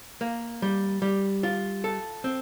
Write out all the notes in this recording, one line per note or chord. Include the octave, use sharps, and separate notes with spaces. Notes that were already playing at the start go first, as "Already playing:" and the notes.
A#3
G3
G3
F4
A4
C4